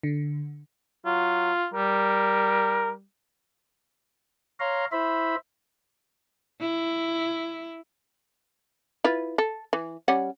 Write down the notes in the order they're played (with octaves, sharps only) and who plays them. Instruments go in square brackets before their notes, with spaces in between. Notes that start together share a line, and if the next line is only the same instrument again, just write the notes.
[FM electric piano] D3
[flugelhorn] F#3 [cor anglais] F4
[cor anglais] G3 [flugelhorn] A#4
[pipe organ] C#5 F5 A#5 C6
E4 C5 E5 B5
[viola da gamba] E4
[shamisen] E4 F4 B4
A4
E3
G3 C#4 F#5